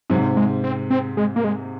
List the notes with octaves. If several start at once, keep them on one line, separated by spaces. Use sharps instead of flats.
G#2 C3 F#3
G#3
C4
C4
G#3
A#3
G#3